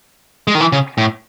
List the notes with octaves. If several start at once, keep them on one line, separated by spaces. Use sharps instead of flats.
G#3
D#3
E3
C#3
A2